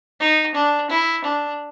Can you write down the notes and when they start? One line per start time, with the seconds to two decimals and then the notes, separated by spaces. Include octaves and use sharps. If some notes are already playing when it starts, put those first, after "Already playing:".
0.20 D#4
0.55 D4
0.90 E4
1.25 D4